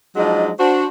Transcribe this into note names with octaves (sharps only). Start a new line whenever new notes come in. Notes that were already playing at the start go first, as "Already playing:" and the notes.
F3 F#3 G#3 D4 D#4 D#5
D4 F#4 C5